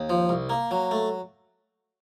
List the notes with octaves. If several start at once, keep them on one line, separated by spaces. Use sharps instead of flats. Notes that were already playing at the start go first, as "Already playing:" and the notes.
Already playing: D#2
F3
C2
A#3
F#3
A3